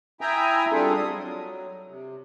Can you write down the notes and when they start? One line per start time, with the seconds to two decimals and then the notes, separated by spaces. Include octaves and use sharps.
0.21 E4 E5 G5 G#5 A#5 D#6
0.72 G3 C4 D4 F4 G#4 A4
0.94 G3 D#6
1.14 F#3
1.88 C3